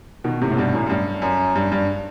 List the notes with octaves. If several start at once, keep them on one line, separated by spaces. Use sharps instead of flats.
B2 D#3
A2 C3
A2
G2 B2
F#2 A2
F#2
G2
F#2
G2
G2